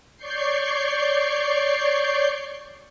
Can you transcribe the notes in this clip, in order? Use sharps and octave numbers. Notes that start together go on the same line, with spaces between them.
C#5 D5 C#6 G6 C7